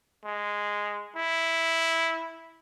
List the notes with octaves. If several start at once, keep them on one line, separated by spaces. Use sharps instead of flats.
G#3
E4